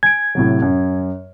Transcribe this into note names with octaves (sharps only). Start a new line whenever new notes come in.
G#5 G#6 D7
A2 C3 F#3
F#2